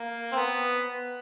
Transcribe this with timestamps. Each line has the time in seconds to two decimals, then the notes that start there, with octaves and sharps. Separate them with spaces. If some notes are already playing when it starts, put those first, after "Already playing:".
Already playing: A#3
0.32 C4
0.37 B3